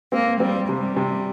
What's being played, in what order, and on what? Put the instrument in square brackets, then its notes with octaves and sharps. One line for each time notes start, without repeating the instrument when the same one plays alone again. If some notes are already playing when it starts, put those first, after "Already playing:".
[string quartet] A#3 [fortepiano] C4
[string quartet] G3 [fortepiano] C4
[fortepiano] C3 [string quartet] G3
[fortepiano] C3